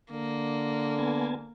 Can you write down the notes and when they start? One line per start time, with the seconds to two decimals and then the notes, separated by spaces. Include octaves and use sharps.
0.12 D3 A#3
0.99 B3 G#5 A5